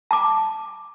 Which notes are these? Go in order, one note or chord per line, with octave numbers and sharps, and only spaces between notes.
A5 D6